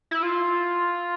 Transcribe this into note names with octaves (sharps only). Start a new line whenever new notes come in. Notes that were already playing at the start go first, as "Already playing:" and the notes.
E4
F4